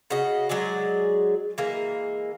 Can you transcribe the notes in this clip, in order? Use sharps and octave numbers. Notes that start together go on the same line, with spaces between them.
C#3 F#4 D#5
F#3 G#3 G#4 D5
E3 G#3 A#3